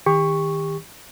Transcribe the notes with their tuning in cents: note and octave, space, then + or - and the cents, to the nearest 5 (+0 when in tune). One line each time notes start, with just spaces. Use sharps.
D#3 +15 G4 +30 C#6 +0